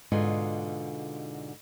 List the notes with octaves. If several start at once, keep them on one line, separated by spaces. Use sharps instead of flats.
G#2 B2 D3 F4 G#4